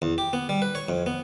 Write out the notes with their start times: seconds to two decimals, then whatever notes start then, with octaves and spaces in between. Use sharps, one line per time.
0.02 E2
0.18 G4
0.33 B3
0.49 G3
0.62 B4
0.75 C#5
0.89 F2
1.06 B3